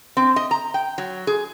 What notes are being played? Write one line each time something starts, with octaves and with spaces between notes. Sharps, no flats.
C4
D#5
A#5
G5
F#3
G#4